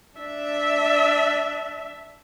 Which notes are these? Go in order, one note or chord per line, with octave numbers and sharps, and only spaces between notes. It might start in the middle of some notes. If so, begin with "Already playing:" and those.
D4 E5